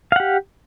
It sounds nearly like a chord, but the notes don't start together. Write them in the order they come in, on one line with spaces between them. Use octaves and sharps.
F5 F#5 G4